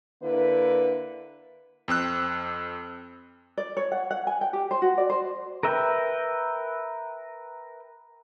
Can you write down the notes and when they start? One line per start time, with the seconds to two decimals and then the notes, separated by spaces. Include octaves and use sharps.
0.22 D3 A#3 E4 B4
1.88 F2 C4 E6 F#6
3.57 D5
3.77 C#5
3.92 F#5
4.11 F#5
4.27 G#5
4.41 G5
4.53 G4
4.71 C5
4.82 F#4
4.98 D5
5.10 C5
5.63 A#4 B4 E5 G5